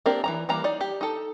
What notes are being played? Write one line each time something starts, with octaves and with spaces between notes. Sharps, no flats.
A#3 C4 D4 G4 A#4
E3 F3 A#5
E3 G3 A#3 A#5
D#4 D5
G4
D#4 A4